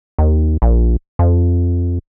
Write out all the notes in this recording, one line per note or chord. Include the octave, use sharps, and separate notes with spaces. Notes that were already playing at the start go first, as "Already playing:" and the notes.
D#2
A#1
F2